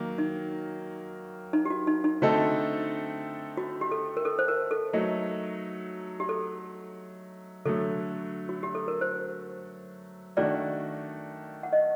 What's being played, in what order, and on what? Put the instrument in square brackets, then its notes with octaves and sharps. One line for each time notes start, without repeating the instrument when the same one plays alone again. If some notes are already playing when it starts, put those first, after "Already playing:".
Already playing: [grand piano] D#3 F#3 A#3
[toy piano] D#4
D#4
G4
F#4
D#4
D#4
[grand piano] D3 A3 C4 D#4 A4 [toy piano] F#4
[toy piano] F#4
G4
A4
A#4
A4
C5
A#4
A4
[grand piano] F#3 A3 D#4
[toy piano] G4
A4
[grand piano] D3 F#3 A3 [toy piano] A4
[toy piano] F#4
G4
A4
A#4
C5
[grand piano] D#3 A3 D4 F#4 [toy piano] D5
[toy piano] F#5
D#5